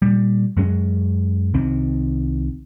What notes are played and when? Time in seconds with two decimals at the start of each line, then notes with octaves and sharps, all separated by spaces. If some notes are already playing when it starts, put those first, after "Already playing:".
0.02 A#2 G3
0.57 F#2 F#3 G#3 C#4
1.54 C2 C3 D#3 C4